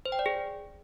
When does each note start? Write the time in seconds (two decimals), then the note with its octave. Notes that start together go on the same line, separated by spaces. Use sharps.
0.05 C5
0.12 G5
0.19 D5
0.26 G#4